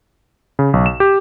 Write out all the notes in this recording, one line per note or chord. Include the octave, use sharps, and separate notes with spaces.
C#3
B1
E7
G4